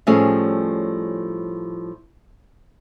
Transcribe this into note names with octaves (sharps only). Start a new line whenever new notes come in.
A2 F3 G3 A3 C#4 G#4